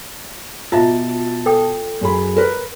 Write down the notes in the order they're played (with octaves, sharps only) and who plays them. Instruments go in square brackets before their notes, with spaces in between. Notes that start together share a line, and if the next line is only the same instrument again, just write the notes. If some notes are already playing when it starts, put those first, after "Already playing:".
[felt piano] B2 A5 [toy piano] F4 D#5 E5
[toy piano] A4 G5 D#6
[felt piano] F#2 G#4 B5
A#4 B4